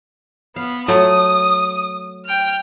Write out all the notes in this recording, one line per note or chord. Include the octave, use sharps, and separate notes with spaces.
B3 F5
F#3 A3 D#6
G5 F6